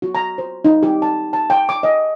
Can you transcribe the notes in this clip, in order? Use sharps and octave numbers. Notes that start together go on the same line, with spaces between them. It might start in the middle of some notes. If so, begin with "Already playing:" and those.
F#4
A#5
C5
D#4
G4
A5
A5
G5
D6
D#5